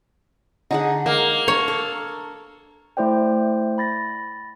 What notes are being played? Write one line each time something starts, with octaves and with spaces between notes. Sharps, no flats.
D3 D#4 G#4 F#5
G#3 A#3
D4 C#5
A4
A3 E4 C5 D5 G5
B5 A6 A#6